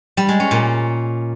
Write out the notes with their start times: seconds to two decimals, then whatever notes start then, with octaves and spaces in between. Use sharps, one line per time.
0.17 G3
0.29 G#3
0.40 C#4
0.51 A#2